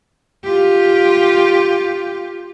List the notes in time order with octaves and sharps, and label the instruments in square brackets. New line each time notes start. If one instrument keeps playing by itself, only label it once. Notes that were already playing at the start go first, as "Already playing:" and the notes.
[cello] F4 G4